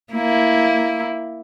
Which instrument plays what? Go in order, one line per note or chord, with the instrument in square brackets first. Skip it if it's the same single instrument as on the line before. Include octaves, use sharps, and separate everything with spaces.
[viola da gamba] A#3 E4